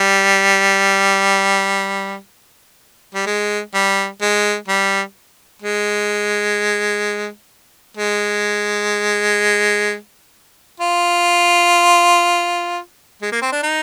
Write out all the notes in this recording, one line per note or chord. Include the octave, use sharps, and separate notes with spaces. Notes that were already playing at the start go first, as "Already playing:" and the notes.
Already playing: G3
G3
G#3
G3
G#3
G3
G#3
G#3
F4
G#3
A#3
C4
D4
D#4